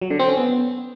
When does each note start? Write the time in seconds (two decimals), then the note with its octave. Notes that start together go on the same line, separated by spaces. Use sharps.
0.01 F#3
0.10 D3
0.19 C4
0.28 C#4
0.37 B3